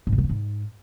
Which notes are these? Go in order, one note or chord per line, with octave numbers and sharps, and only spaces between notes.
G#2
C3
F#3
E3
G#2